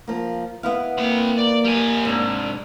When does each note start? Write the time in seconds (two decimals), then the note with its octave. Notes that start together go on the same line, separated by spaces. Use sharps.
0.08 F3 A#3
0.63 B3 E4 F5
0.98 A#3 C4 B5
1.38 D5
1.65 G3 G#5
2.05 C2 G#2 D4